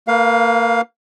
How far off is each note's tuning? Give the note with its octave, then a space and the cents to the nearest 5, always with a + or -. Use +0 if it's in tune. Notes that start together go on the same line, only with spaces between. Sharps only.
A#3 -25 B4 -40 F5 +10